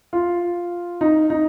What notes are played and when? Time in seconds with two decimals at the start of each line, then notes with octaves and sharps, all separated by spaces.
0.13 F4
1.01 D#4
1.30 D#4